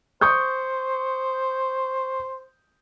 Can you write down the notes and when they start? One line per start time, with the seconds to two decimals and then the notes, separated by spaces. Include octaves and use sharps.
0.21 C5 C#6 D#6 G6